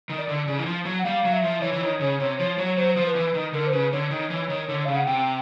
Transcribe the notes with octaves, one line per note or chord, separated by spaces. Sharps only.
D#3
D5
D3
C#3
E3
F3
F#3
F#5
G3 F5
F#3
E5
F3
E3 C#5
E3
D#3
C#3
C3
F3
F#3
C#5
F#3 C5
F3 C5
B4
E3
D#3
D3 A#4
C5
C#3 B4
D3 C#5
D#3
E3
D#3
D3
C#3 F5
F#5
C3 G5